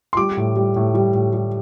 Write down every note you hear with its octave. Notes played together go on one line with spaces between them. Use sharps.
C6
G3 D6
A2
G3
A2
G3
A2
G3